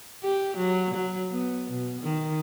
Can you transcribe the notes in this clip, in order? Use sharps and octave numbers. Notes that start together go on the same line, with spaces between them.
G4
F#3
F#3
B3
B2
D#3